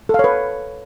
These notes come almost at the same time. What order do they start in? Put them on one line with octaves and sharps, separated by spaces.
A4 F5 C#5 B4